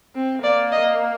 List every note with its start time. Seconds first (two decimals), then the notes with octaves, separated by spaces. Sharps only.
0.15 C4
0.44 A#3 D5
0.72 D#5